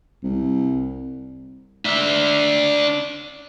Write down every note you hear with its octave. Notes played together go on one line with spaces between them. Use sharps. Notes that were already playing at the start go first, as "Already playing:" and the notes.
C2
D4 E5